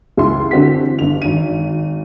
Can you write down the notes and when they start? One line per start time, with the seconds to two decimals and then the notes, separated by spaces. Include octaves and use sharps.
0.17 C#2 E4 C6
0.51 D3 E3 C4 F#4 G4 B6
0.99 G1 F7
1.22 G#1 D#7